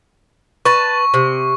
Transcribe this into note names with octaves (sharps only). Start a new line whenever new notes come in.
B4 A5 C#6
C3